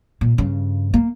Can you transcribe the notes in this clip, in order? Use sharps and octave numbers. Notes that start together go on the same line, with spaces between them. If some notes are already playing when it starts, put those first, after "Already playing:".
A#2
G2 C#3
A#3